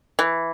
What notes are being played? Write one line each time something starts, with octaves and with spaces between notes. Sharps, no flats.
E3